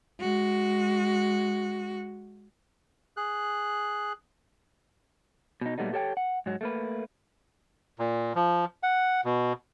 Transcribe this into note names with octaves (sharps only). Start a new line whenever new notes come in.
G#3 F#4
G#4 F#6
B2 D#4
A#2 F#3 G3 A3 B3 D#4
G4 A4 C#5 E5 G5
F#5
G#2 F#3
A3 A#3 B4
A#2
F3
F#5
B2